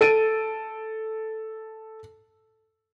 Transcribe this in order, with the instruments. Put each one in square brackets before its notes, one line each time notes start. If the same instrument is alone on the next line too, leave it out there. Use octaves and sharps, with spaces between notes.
[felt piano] A4 D7 D#7